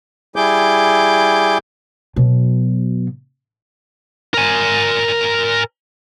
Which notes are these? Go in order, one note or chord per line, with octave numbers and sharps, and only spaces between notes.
G3 E4 G#4 D6 G6
B2 F#3
A#4 G#5